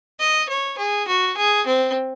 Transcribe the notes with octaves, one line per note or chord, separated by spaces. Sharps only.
D#5
C#5
G#4
F#4
G#4
C4